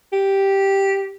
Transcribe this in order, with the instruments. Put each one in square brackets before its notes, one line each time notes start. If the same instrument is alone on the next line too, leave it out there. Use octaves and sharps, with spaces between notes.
[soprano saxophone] G4